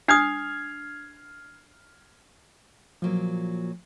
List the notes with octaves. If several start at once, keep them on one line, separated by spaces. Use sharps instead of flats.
D4 D#6 F6 G#6 C7
A#2 F3 F#3 A#3